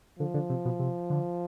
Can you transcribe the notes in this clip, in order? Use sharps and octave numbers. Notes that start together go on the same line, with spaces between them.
D3 F3
D3
C3
B2
C3
D3